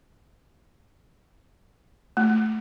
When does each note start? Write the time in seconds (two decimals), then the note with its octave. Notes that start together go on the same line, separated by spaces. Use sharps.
2.17 A3